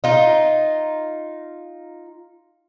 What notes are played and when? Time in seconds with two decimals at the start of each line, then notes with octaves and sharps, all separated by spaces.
0.04 D#4 F4